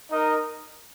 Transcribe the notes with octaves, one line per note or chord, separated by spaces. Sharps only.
D#4 A#4 D#5